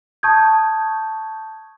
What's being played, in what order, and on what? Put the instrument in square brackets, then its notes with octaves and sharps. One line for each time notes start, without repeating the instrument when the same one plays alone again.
[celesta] A5 C#6 D#6 G6 G#6